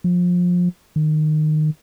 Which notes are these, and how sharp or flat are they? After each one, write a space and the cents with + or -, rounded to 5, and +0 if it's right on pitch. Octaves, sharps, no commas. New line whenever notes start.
F3 +25
D#3 -20